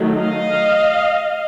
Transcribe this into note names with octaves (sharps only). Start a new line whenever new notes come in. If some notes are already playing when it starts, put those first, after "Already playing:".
Already playing: D#3 F#3 A3
D#5 F5